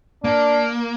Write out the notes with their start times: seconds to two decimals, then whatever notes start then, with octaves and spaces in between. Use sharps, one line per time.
0.24 A#3 D4